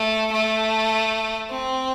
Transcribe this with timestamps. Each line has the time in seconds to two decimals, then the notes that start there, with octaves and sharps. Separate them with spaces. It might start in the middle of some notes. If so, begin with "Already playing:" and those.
Already playing: A3
0.32 A3
1.50 C4